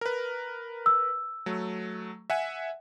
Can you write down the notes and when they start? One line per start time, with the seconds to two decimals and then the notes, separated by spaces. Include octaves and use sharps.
0.01 A#4 B4
0.86 E6
1.46 F#3 A3
2.30 E5 F#5 G#5